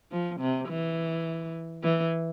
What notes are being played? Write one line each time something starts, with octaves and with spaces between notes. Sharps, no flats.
F3
C3
E3
E3